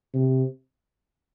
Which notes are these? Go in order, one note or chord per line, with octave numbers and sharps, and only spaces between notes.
C3